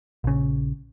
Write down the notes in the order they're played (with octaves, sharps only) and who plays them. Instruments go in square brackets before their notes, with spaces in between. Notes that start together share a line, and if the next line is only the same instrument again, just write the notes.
[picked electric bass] A#1 C#3